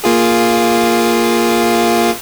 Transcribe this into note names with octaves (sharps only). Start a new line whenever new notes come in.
A#3 F4 G#4